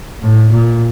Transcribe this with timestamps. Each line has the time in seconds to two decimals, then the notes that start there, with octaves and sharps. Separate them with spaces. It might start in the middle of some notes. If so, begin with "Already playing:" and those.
0.23 A2
0.52 A#2